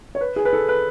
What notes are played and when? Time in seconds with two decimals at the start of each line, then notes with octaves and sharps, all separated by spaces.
0.15 C#5
0.21 B4
0.36 G#4
0.45 B4
0.53 A4
0.69 B4